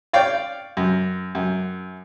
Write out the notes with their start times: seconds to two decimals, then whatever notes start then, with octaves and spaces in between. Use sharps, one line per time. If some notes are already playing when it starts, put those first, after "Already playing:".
0.13 C#5 D5 F5 G5
0.77 F#2
1.35 F#2